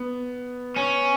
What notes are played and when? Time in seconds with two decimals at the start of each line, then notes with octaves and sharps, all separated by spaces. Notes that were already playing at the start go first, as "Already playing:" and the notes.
Already playing: B3
0.76 C#4